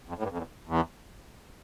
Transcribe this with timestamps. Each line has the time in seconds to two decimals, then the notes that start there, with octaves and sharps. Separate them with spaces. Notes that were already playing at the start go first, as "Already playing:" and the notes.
0.09 F2
0.19 A2
0.23 G2
0.31 F2
0.38 E2
0.68 E2